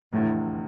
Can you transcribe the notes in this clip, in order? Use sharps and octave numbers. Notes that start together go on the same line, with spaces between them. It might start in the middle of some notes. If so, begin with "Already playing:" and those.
F1 E2 A2 D3